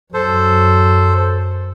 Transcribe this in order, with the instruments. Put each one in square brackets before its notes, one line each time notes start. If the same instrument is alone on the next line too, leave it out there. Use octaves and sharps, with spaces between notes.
[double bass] F#2 [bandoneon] A4 C5